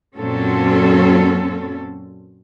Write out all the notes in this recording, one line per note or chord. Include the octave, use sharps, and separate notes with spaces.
F#2 A#2 F#3 C4 C#4 A4